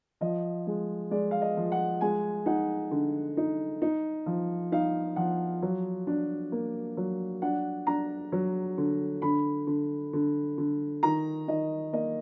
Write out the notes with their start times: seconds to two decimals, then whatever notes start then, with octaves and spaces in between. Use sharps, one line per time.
0.21 F3 D#5
0.67 G#3
1.11 G#3 D5
1.31 F5
1.42 D#5
1.57 F3
1.72 F#5
2.01 G#3 G#5
2.46 D#4 F#5
2.91 D3
3.37 D#4
3.82 D#4
4.26 F3
4.72 D#4 F5
5.16 F3 F#5
5.62 F#3
6.07 D4
6.52 A#3
6.97 F#3
7.42 D4 F#5
7.87 D4 A#5
8.32 F#3
8.78 D3
9.22 D3 B5
9.67 D3
10.13 D3
10.58 D3
11.03 D#3 A#5
11.48 D#3 D#5
11.93 A#3 D#5